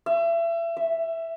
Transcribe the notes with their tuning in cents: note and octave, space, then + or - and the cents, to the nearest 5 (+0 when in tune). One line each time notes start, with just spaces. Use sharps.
E5 +30
E5 +0